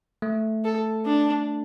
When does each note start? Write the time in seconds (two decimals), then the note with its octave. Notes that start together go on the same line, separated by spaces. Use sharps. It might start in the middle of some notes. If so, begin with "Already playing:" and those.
0.22 A3
0.64 A4
1.05 D4